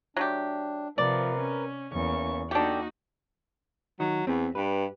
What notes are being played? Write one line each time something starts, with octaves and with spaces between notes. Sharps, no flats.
F#3 A3 D4 G4
C3 F3 A#4 B4 D5
C#4
E2 A#3 C#4 C#6
A#3 D4 D#4 F#4 G4 A4
D#3 F#3
E2 C4 B4
G2 G4 B4